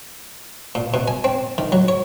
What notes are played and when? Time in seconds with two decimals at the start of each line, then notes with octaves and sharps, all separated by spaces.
0.75 A#2
0.94 B2
1.08 G#5
1.24 C4
1.58 D#3
1.72 F#3
1.88 C#5